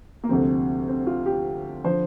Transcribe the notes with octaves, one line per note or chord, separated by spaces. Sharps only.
A#3
D2 C3 F3 C4
C4
F4
G4
D3 F3 C5